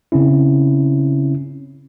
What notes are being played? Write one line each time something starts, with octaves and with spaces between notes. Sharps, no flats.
C#3 C4 C#4 E4